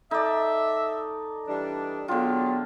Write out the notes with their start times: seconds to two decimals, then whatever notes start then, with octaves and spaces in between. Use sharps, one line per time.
0.11 D#4 A4 D5 E5 A5
1.47 E3 G3 D4
2.08 D3 F#3 G#3 B3 D4 F4 G5